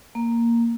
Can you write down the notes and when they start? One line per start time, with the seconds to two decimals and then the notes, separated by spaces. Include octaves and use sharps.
0.15 A#3